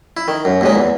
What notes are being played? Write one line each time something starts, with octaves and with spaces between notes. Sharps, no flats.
E4
D#3
F#2
D#2 A#2 G#3
E2